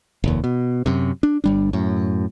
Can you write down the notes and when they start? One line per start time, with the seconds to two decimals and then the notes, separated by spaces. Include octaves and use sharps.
0.24 F1 D#2
0.44 B2
0.86 F#2 C3
1.23 D4
1.44 G1 G3 D4
1.73 F#2 A2